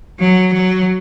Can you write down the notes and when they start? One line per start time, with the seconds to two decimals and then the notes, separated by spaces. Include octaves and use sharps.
0.20 F#3
0.53 F#3